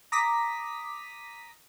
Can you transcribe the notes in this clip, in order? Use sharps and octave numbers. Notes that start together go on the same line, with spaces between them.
A#5 D6 D#6 A#6 B6